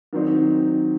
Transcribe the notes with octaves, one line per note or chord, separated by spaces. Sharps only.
D#3 F#3 C4 D#4